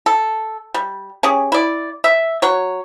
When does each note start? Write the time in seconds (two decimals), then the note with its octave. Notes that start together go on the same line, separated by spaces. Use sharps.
0.06 A4
0.74 G3
1.23 C#4 G4 G#4
1.52 E4 D5
2.04 E5
2.42 F#3 C#5